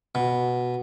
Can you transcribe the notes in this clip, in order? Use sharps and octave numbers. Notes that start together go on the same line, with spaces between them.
B2